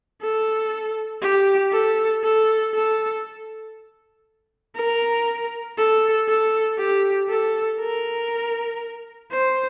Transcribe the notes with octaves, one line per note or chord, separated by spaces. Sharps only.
A4
G4
A4
A4
A4
A#4
A4
A4
G4
A4
A#4
C5